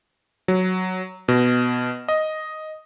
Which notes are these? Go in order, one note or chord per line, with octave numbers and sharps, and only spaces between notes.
F#3
B2
D#5